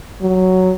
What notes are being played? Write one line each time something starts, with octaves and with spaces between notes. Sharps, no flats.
F#3